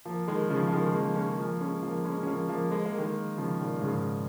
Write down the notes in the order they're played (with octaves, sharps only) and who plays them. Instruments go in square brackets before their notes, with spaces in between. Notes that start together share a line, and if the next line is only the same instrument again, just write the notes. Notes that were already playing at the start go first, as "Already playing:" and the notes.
[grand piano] F3 A#3
D#3 G#3
C#3 F3
F3
D#3 G#3
G#3
F3 A#3
G#3 C#4
F3 A#3
G#3 C#4
F3 A#3
G#3 C#4
C#4
F3 A#3
F3 A#3
G#3
A#3
D#3 G#3
C#3 F3
A#2 D#3
G#2 C#3